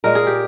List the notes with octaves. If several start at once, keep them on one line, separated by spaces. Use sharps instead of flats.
A#2 G#3 A#4
G#4
G4